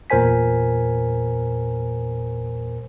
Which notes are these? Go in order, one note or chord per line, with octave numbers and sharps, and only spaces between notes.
E2 A#2 A#4 C5 G#5 B6